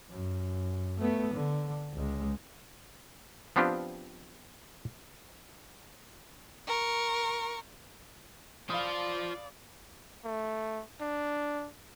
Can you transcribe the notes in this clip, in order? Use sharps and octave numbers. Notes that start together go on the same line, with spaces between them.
F#2
A3 B3
D3
C#2 G#3
F3 B3 C4 D4 F4 G4
A#4 C#6
F4 C5 D5 F5 B5 D#6
A3
D4